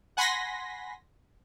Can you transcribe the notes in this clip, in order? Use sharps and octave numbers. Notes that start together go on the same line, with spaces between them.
F#5 G#5 B5 C6 A#6 B6